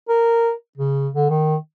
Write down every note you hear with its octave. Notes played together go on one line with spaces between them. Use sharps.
A#4
C#3
D3
D#3